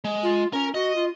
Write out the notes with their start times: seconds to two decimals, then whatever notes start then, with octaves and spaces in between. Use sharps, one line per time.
0.04 G#3
0.23 F4
0.53 C#4 A#4 A#5
0.74 F#4 D#5
0.96 F4